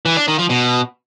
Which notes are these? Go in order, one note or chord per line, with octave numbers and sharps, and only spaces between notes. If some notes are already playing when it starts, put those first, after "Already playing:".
E3
D4
D#3
F3
B2